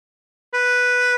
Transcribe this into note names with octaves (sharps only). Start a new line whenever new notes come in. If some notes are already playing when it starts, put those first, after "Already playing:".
B4